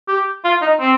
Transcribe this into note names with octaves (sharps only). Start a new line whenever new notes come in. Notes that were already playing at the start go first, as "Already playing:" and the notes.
G4
F4
D#4
C4